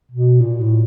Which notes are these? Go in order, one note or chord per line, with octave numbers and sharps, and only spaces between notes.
B2
A#2
A2